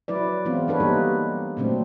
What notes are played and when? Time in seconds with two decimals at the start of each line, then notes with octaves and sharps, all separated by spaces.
0.08 F#3 E4 B4 D5
0.45 E3 G#3 B3 C4 F4
0.68 D4 A4 B4 C#5
0.80 G3 A#3 D#4 G4
1.57 A#2 D3 F#3 A3 C4 D4